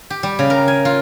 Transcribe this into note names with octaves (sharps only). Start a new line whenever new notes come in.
G4
G3
C#3
A#4
G#5
F4